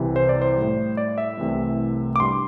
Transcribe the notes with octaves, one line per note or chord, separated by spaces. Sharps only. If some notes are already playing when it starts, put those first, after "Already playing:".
Already playing: C2 C3 E3
C5
D5
C5
A2 G3
D5
E5
C2 C3 E3 A3
D6
G2 G3 C6